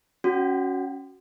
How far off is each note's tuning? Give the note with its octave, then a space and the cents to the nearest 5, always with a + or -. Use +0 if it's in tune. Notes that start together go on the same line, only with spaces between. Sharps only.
C#4 +0 F#4 +0